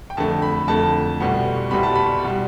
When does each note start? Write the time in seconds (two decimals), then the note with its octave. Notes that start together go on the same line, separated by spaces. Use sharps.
0.10 G5
0.17 F2 D3 A3 A5
0.42 B5
0.68 F2 D3 A3 A5
1.20 C2 B2 G3 B3
1.71 C2 B2 G3 B3 B5
1.83 A5
1.95 B5
2.25 B2 G3